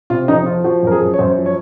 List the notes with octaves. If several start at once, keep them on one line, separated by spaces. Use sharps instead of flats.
C3 F4
F2 D#4
F3 F4
F3 F#4
F#2 A#4
G#4
F#2
C#5
F#2 C5
F3
C#5